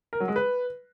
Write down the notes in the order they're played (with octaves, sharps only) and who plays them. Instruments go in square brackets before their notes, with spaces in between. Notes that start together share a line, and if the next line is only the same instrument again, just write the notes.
[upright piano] A#4
F#3
G#3
B4